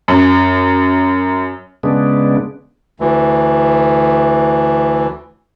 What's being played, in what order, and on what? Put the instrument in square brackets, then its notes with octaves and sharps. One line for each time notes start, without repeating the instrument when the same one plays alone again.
[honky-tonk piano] F#2
[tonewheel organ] C#3 G#3 B3 D4
[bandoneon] D2 E3